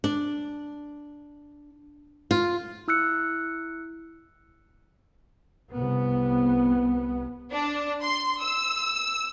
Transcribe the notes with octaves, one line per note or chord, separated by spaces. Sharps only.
D4
F4
E4 E6 F#6 C#7
C2 B3
D4
C6
E6